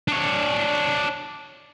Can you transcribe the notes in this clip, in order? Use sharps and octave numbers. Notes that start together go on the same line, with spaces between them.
D4 C#5